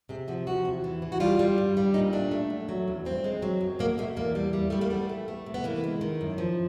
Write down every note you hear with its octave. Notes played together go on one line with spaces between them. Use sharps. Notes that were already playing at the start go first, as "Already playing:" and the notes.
C3 G#4
F3 F#4
F3 F#4
E2
E3
E3
F#4
G3 F4
G3
G2
G3
A#2 D#4
A3 D4
A3
F#2
F#3
E2
G2 C4
G#3
F#3
F#2
B2 A#3
B2 A3
E2 A#3
G3
G3
G3 A3
A#3
A3 B3
A3
A3
C3
B3
E3 A#3
G#3
D#3
F#2
F3